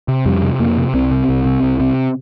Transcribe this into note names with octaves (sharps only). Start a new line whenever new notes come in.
C3
F2 G3
C3
F2 A#3
C3
C2 C4
C3
C2
C3
C2
C3